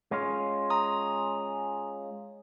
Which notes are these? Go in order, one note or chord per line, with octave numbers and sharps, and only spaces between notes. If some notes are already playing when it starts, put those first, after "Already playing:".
G#3 C#4 F4
A#5 D#6